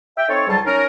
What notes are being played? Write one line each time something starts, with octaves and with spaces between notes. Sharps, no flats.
E5 G5
C4 D#4 A4 C#5
C#2 G#2 F#3 G3 F4 A5
C#4 D#4 A#4